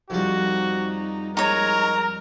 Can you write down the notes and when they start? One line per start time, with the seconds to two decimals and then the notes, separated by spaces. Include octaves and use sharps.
0.10 F2 G3 D#4 F#4
1.37 G#3 D#4 A#4 C#5 A#5